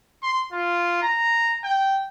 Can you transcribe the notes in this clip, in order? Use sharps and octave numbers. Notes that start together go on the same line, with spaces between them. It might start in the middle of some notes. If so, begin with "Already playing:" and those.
C6
F4
A#5
G5